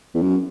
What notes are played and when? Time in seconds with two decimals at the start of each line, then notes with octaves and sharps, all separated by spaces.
0.15 E2
0.22 F#2